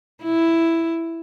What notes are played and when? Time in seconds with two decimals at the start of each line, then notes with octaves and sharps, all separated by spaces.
0.23 E4